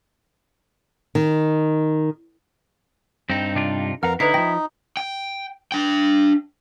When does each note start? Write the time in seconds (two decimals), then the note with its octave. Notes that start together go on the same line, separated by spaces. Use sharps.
1.15 D#3
3.30 G2 C4 D#4
3.55 C3 D4 F4
4.03 F2 A#4 B4 F5 F#5 F6
4.20 D3 D#4 E4 B4 A#6 C7
4.34 E3 F3 G5 A#6
4.97 G5
5.72 D4 G5